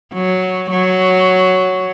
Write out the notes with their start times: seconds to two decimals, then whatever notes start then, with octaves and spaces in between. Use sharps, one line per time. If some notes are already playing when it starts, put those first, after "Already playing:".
0.14 F#3
0.71 F#3